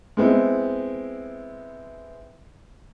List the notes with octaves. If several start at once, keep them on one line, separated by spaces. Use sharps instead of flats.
G#3 B3 C4 E4